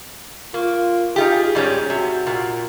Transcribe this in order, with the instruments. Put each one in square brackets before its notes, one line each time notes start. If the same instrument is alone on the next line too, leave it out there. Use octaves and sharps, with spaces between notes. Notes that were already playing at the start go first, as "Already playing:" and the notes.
[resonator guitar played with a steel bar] A#3 [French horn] F4
[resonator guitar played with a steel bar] D#4 F4 G4 [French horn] G#4
[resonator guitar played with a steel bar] G#2 G3 C#4
[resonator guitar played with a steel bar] C3 [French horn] F#4
[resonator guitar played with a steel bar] A#2